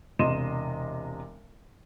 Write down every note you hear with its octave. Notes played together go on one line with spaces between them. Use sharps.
E1 C3 D#5 C6 D#7 E7